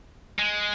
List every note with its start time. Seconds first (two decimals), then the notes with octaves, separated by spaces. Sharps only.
0.39 G#3